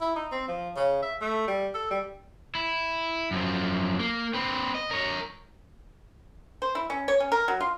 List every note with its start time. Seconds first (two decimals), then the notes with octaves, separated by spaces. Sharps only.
0.01 E4
0.16 D#4
0.32 C4
0.48 F3
0.76 C#3
1.02 E5
1.21 A3
1.48 G3
1.74 A4
1.91 G3
2.55 E4
3.31 F#2 F3
4.00 A#3
4.34 C4 B4
4.75 D#5
4.91 A#4 C#5
6.62 C5
6.75 E4
6.90 C#4
7.08 C#5
7.20 C#4
7.32 A#4
7.48 F#3
7.60 F4